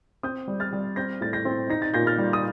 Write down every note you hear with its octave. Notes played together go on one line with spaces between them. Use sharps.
C4 D#6 G6
G3
F6 A6
G3
C4 G6 A#6
A2 A6
G6 A#6
C4
D#4 A#6
A6
A#2 G6 A#6
F6 A6
G3
D#6